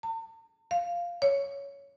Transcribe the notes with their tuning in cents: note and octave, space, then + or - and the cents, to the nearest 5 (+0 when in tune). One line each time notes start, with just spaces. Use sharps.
A5 +45
F5 -5
C#5 +10